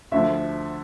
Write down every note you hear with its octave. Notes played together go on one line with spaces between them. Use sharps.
D2 D3 F3 E5